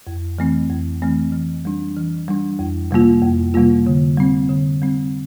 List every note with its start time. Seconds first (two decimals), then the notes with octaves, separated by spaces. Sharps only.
0.07 F2
0.39 E3 A3 C4
0.70 F2
1.02 E3 A3 C4
1.32 E3
1.65 G3 D4
1.96 E3
2.28 G3 D4
2.59 F2
2.91 C3 G3 A#3 F4
3.23 F2
3.54 C3 G3 A#3 F4
3.86 D3
4.18 G3 C4
4.49 D3
4.82 G3 C4